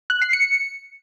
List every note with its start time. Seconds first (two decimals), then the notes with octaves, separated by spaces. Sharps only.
0.10 F#6
0.22 C7
0.33 C#7